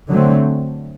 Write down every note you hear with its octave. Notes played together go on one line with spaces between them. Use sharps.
D3 F#3 A3 C4